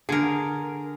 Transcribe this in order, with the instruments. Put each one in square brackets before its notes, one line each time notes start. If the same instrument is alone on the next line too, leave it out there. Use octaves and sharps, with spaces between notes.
[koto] D3 A#4 [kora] G#4